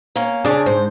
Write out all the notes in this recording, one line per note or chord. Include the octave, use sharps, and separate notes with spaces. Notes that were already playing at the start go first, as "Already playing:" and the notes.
A#3 C#4
C#3 C#4 D4 G#4 D5
G#2 C5